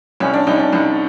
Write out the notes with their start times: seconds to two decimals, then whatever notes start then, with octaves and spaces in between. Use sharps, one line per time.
0.20 C2 C#4
0.34 D4
0.47 C2 D#4
0.55 C#4
0.59 D4
0.72 C2 D#4